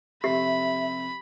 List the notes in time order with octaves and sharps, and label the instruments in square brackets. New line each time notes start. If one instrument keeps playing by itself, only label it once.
[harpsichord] F2 C3 [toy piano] G4 [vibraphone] E5 [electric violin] B5